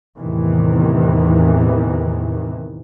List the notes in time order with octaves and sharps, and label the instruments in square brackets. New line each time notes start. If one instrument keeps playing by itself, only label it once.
[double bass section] E2 A2 C3 D#3 E3